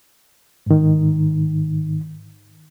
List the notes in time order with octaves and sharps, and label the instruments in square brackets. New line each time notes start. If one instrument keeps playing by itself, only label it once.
[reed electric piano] G#2 D#3